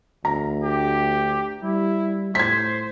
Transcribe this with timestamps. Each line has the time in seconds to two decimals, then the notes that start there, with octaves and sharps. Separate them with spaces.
0.25 D2 A#5
0.63 G4
1.63 G3 E4
2.35 A2 C5 G#6 B6